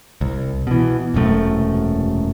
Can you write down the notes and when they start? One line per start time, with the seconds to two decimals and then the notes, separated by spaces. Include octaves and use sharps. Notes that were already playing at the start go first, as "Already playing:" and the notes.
0.21 C2
0.67 B2 E3
1.14 E1 C2 F#2 A3